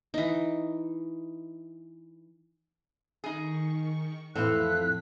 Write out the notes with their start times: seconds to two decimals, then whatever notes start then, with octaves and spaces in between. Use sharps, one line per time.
0.14 E3 D#4
3.24 D#3 D#4 G#4 C#6
4.35 F2 A2 E3 C4 A4 F5 F#6 B6